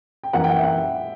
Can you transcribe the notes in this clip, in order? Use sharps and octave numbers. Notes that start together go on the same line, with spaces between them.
G5
F#2 E3 A#3 C#4 F#5
G5
F#5
E5
F#5